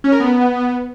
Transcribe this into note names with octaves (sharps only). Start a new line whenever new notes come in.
C#4
A#4
B3